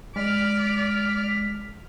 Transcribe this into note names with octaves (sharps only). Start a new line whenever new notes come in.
G#3 D5 F6 B6